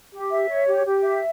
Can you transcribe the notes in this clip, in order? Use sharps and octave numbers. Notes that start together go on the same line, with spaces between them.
G4
E5
C#5
G4
G4
E5